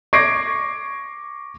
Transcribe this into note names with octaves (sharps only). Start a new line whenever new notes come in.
C#6 D6 G#6 A#6 C7 D7